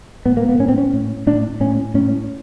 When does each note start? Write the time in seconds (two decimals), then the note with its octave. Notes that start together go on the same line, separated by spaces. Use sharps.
0.26 A2 B3
0.37 A#3
0.49 B3
0.59 A2 C#4
0.69 C4
0.78 C#4
0.93 A2
1.27 A2 D4
1.60 A2 C#4
1.94 A2 C#4